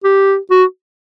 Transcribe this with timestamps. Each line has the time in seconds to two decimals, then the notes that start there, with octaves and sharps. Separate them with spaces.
0.04 G4
0.51 F#4